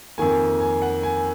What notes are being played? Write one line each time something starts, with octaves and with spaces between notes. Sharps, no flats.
F2 D#3 A#3 G#5
G#5
F#5
G#5